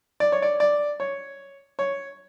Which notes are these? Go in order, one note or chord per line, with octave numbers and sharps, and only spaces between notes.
D5
C#5
D5
D5
C#5
C#5